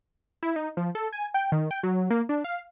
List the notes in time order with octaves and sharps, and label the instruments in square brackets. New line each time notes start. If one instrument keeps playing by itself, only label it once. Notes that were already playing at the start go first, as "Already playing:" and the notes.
[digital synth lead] E4
D#4
F3
A4
G#5
G5
D#3
G5
F#3
A#3
D4
F5